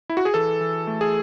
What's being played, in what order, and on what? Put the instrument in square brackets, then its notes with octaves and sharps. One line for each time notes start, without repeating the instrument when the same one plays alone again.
[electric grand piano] E4
F#4
G#4
E3 A4
E3
A3
G#4